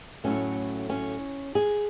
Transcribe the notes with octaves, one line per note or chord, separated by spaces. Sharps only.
A2 F#3 A3 C#4
C#4
G#4